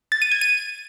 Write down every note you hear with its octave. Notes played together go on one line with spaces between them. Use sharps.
A6
D#7
G#6
D#7